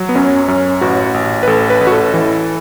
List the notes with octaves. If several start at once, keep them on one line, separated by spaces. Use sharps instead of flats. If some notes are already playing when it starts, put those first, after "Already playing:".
Already playing: F#3
B3
F#2 C#4
F#2 C#4
A1 F#4
A1
B4
A1 A4
B4
A1
F#4
A4
E3